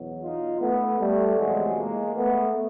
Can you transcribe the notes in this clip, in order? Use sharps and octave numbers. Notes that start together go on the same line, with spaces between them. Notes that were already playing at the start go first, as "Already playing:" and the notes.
Already playing: E2 B2 F#3
D#4 F4
A3 B3
G3 A3
E2 C3 F3 F#3 G#3
G#3 A#3
A3 B3